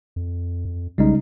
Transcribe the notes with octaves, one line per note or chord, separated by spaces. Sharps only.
F2
F2
B1 C#3 G3 G#3 D#4